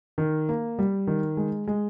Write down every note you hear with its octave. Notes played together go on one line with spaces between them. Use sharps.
D#3
A#3
G3
D#3
G#3
G#3